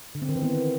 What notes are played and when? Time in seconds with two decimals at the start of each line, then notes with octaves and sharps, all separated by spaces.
0.15 D3
0.22 C4
0.29 D#3
0.36 E3
0.43 B3